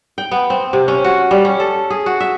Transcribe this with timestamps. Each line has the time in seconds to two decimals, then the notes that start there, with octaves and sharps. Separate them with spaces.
0.18 G5
0.31 B3
0.50 C4
0.73 C3
0.88 C#4
1.04 F#4
1.31 G3
1.45 C#4
1.60 A4
1.90 G#4
2.06 F#4
2.20 E5